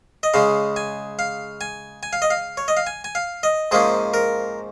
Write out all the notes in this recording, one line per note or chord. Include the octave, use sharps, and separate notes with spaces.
D#5
C#3 G#3 C#4 F5
G#5
F5
G#5
G#5
F5
D#5
F5
C#5
D#5
F5
G#5
G#5
F5
D#5
G#2 F3 A#3 C#4 G#4
A#4